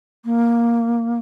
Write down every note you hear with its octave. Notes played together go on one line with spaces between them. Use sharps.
A#3